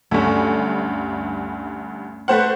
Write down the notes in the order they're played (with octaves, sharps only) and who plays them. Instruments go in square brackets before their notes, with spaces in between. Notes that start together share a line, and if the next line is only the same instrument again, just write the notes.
[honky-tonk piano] D2 G2 [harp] A3 C#4
[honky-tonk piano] A3 C5 F#5 [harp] B4 F#6